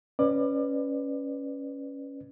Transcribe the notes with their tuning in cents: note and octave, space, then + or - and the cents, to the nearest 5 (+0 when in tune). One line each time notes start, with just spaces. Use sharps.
C#4 +0 B4 +5 D5 +30